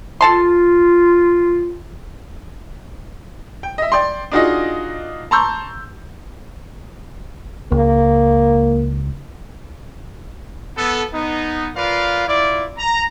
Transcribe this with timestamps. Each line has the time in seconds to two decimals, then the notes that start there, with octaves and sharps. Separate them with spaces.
0.21 F4 A4 A5 C6
3.63 G5
3.78 D#5 E5
3.92 D5 G5 C6
4.32 D4 D#4 F4 F#4 G#4 D#5
5.31 A5 A#5 C6 C#6 E6 G6
7.72 C#2 A#3
10.76 B3 A4
11.13 B3 D#4
11.75 F4 A#4 B4 D5 F5
12.28 E4 F4 D5
12.77 A#5